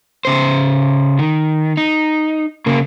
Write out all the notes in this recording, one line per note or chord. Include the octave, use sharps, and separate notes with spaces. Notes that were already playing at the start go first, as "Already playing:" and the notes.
C#3 C5
D#3
D#4
C#3 A#3